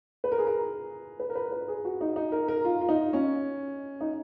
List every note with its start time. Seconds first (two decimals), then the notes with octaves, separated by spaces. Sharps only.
0.24 B4
0.32 A#4
0.38 G#4
0.47 A#4
1.20 B4
1.30 A#4
1.35 B4
1.52 B4
1.68 G#4
1.85 F#4
2.01 D#4
2.16 D#4
2.32 A#4
2.48 A#4
2.65 F4
2.81 F4
2.89 D#4
3.13 C#4
4.01 D#4